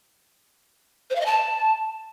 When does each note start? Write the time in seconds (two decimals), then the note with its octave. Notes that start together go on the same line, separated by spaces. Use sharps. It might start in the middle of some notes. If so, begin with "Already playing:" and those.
1.10 C5
1.15 F5
1.20 D#5
1.26 A5